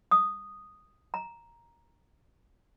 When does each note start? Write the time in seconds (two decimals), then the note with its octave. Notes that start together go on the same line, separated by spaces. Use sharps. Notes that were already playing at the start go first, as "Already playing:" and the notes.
0.11 D#6
1.14 A#5